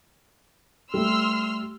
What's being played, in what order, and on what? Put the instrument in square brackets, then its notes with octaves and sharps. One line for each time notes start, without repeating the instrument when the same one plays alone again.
[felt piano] G3 A3 [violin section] C6 E6 F6